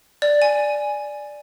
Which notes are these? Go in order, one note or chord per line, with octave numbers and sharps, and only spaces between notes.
D5
G#5